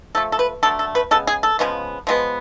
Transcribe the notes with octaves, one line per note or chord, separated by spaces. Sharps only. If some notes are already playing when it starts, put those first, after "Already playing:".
F3 A3 A4
A4
B4
D3 F#3 A3 A4
A4
B4
C#3 G#3 B3 A4
G#4
A4
C#3 F3 G#3 B3
F3 G#3 B3